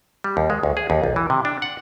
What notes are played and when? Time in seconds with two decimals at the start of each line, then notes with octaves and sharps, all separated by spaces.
0.24 G3
0.37 D#2
0.50 G#3
0.63 D2
0.77 G#4
0.90 D#2
1.04 B1
1.16 E3
1.30 C3
1.45 D4
1.62 F#5